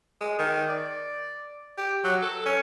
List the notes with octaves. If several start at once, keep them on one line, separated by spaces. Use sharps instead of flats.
G#3
D#3
D5
G4
F#3
A4
C#4